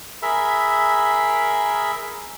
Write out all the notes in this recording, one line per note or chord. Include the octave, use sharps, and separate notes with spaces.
G#4 A#4 E5 B5